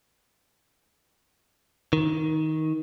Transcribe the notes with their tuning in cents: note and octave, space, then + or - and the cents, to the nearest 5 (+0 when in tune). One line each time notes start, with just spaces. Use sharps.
D#3 +15